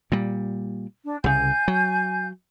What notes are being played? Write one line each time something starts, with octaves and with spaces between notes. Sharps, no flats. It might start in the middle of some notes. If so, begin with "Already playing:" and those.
A#2 G3
D4
C2 C#3 F5 G#5 G6
F#3